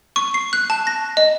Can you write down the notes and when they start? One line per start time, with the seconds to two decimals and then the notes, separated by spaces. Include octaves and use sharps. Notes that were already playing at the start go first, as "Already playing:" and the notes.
0.16 C#6
0.34 C7
0.53 F#6
0.70 A5
0.87 A#6
1.17 D#5